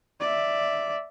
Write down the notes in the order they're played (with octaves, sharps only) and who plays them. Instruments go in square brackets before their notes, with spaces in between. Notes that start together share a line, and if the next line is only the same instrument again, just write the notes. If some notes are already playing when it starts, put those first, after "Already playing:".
[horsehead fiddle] D5 E5